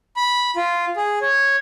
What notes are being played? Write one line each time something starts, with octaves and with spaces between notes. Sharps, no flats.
B5
F4
G#4
C#5